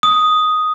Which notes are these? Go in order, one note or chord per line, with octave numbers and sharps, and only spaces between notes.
D#6